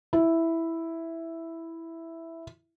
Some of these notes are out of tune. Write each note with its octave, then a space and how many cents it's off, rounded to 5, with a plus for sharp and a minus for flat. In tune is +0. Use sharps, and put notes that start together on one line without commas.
E4 +0